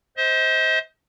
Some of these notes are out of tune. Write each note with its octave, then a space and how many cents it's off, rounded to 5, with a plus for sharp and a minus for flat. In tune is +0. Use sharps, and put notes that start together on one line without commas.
C5 +0 D#5 +40